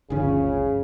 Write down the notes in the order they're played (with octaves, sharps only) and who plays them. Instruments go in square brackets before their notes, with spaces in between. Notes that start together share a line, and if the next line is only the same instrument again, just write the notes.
[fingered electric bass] G1 D2 F3 [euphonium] C#3 [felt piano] C#4 G#4